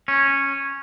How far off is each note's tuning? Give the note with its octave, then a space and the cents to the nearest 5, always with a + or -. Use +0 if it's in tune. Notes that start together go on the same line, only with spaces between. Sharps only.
C#4 -10